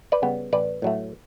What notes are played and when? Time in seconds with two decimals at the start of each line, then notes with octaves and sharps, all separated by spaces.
0.12 B4 D5
0.22 C#3 G3 B3
0.53 A1 B4 D5
0.82 A2 F#3 A3